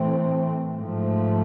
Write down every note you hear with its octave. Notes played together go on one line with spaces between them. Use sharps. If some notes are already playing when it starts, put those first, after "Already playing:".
Already playing: A2 E3 A3 C4
G#2 F3 A3